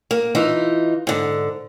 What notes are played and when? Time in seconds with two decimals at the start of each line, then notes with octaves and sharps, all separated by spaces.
0.11 A#3
0.35 E3 D#4 F4
1.07 G#2 D3